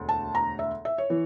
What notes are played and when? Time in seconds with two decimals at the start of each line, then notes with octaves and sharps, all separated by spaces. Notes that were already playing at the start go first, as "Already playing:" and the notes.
Already playing: E1 D2
0.09 A5
0.35 A#5
0.59 E5
0.85 E5
0.98 C#5
1.10 E3